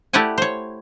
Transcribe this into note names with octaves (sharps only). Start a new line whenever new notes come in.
A3 E4 G4 D5 F#5 G#5
C5 C#5